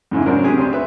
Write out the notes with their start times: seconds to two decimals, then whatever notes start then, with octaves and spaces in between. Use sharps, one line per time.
0.11 F2 G#2 C#3 E4
0.26 C#3 F#3 C4 D4 F#4 A#4
0.44 C3 G4 G#4 G#5
0.58 D2 C4 C5
0.73 F#4 B4 E5